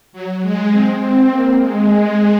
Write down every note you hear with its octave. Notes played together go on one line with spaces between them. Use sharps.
F#3
G#3
C4
C4
A#3
G#3